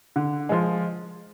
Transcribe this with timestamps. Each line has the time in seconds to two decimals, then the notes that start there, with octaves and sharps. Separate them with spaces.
0.16 D3
0.49 F3 G#3